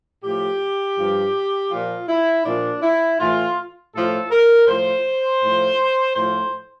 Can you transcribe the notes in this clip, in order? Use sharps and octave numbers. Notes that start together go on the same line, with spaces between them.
A2 F3 G4
G2 F3
A#2 F3 F4
E4
A#2 F3 D4
E4
A2 E3 F4
A2 F3 A4
A#4
A2 F3 C5
A2 F3
A2 F3 C5